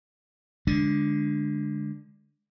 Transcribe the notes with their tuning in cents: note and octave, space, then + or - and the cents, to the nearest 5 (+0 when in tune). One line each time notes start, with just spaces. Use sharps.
D3 +0 G#3 +0 D4 +0